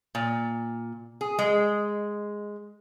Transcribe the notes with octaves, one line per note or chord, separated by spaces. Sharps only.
A#2
G#4
G#3